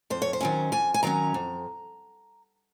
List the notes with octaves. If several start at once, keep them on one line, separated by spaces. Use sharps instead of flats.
F2 C5
C#5
C5
D#3 F#3 C#4
F2 G#5
G#5
D#3 F#3 C#4 A#5
F2